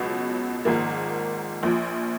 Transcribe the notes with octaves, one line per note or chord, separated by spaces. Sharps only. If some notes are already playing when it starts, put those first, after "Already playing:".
Already playing: C#2 B2 F#3
G#1 G#2 F3 A#3
A#1 A#2 F3